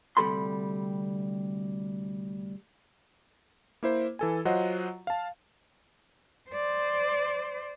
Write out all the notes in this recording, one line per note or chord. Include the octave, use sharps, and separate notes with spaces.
D2 C3 G3 A4 B5 C6
A#3 E4 C5
E3 A4 G#5
F#3 F4 C5 D#5 F#5
F5 A5
C5 D5